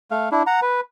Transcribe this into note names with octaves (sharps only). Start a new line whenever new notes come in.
A3 F5
D4 E4
F#5 A#5
B4